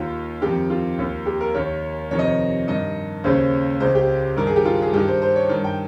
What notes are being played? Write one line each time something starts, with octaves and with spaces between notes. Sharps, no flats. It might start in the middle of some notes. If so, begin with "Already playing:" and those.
Already playing: D#2 D#3 F4
F2 D#3 G4
F4
D#2 D#3
G4
A#4
D#2 D#3 C#5
F2 C3 D#3 C#5
D#5
C#5
G2 D#3 D#5
D#2 C#3 C5
C#2 C#3 C5
G4
G2 D#3 A#4
G#4
G4
F4
G#4
G2 D#3 G4
C5
C5
C#5
G2 D#3
G5